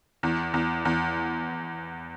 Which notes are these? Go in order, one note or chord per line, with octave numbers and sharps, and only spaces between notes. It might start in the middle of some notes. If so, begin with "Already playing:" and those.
E2
E2
E2